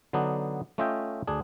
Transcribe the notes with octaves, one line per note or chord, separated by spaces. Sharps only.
D3 F#3 B3 D4 D#4
A3 C#4 F4 D#5 E5 G5
D2 D4 G#4